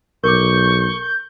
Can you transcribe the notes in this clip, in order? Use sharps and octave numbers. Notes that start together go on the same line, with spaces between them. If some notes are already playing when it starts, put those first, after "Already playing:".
B1 A#4 C#6 D6 G6